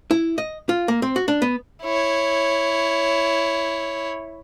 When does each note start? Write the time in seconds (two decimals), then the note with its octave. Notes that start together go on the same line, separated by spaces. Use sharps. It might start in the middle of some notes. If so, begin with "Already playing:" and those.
0.11 E4
0.38 D#5
0.69 F4
0.88 A#3
1.02 C4
1.16 F#4
1.28 D4
1.42 B3
1.83 E4 C#5